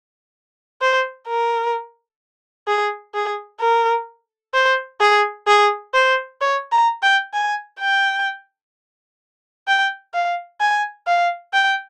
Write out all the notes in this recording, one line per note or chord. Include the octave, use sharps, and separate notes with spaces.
C5
A#4
G#4
G#4
A#4
C5
G#4
G#4
C5
C#5
A#5
G5
G#5
G5
G5
F5
G#5
F5
G5